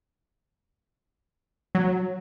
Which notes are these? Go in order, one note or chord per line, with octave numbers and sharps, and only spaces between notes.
F#3